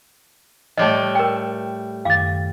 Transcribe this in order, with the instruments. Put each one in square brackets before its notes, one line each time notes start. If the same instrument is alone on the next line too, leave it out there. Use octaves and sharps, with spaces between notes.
[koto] A2 G3 A3 [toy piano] D#5
[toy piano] A#4 G5
[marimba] F#2 D#3 A6 [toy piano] F5 D6